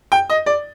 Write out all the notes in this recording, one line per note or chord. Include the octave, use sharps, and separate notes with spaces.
G5
D#5
D5